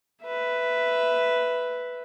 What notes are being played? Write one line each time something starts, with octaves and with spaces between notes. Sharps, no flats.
B4 E5